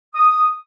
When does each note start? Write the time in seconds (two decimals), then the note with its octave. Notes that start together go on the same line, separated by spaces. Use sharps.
0.14 D#6